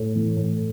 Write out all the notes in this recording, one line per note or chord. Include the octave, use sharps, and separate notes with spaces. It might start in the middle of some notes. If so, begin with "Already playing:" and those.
Already playing: A2
E3
A2